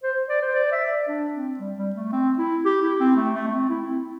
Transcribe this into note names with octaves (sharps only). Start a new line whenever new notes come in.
C5
D5
C5
D5
E5
D5
D4
C4
G3
G3
A3
C4
E4
G4
E4
C4
A3
A3
A3
C4
E4
C4